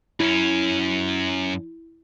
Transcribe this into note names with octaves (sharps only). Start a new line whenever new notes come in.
F#2 C#4 E4